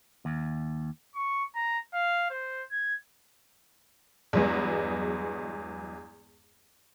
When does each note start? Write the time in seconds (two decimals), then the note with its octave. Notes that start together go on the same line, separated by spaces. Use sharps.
0.25 D#2
1.15 C#6
1.55 A#5
1.94 F5
2.30 C5
2.71 G#6
4.33 E2 G2 F#3 G#3 B3